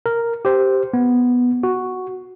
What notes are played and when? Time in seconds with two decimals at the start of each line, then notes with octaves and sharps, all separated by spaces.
0.06 A#4
0.45 G4 C5
0.94 B3
1.63 F#4